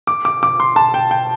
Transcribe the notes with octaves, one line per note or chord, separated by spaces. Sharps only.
D6
D6
D6
C6
A5
G5
G5